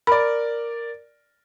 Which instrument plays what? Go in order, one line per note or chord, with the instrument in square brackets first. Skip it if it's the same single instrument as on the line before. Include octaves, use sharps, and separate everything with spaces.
[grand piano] A#4 D5 [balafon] B5